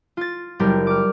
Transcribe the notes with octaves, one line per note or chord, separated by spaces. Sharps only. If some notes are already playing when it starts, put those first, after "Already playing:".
F4 A6
F#1 G3 G4 A#4
D6 F6